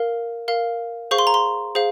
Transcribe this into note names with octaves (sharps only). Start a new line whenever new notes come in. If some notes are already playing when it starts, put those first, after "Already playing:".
Already playing: A#4 F5
A#4 F5
G#4 C5 F5 C#6
C6
A#5
C6
G#4 C5 F5